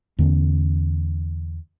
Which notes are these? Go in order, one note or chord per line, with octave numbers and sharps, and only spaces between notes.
E2 D3 A3 C#4